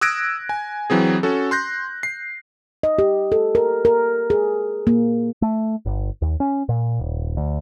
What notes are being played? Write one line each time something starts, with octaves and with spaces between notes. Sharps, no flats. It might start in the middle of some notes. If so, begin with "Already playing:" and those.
D#6 E6 F#6 G#6 A#6 D7
G#5
E3 F#3 C4 G#4
C#4 F#4 A4
C6 F#6 G6 A#6
C7
D#5
G4
A4
A#4
A#4
G#4
A#3
A3
G1
D#2
C#4
A#2
D#1
D2